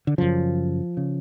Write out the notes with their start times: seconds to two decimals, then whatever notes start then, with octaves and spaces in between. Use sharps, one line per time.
0.07 D3
0.18 F#2 C#3 F3
0.97 C#3